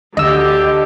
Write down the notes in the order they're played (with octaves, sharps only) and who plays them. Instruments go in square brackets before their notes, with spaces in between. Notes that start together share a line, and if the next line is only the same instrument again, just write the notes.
[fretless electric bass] D2 [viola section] D3 G4 [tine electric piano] D#5 E6